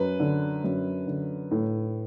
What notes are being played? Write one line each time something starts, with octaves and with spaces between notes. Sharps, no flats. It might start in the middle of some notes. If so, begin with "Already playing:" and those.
Already playing: F#2 B4
D3
F#2
D3
A2